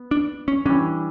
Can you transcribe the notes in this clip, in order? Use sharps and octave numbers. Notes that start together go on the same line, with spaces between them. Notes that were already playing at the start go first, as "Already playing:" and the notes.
Already playing: B3
D4
C#4
E3 G3 C#4 D4